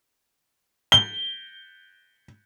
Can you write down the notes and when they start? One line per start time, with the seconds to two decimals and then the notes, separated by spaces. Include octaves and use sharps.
0.92 G7